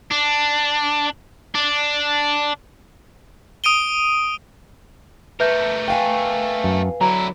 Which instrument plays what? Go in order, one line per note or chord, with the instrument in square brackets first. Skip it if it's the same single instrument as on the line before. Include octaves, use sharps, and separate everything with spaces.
[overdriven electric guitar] D4
D4
[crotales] D#6 D7 D#7 G7
[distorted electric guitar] A3 A#4 [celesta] B4 E5 G6
[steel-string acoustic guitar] B4 F5 G#5 [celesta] G5
[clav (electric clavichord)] F#2
[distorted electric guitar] D3 E4 [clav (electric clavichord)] F#3 [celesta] A#5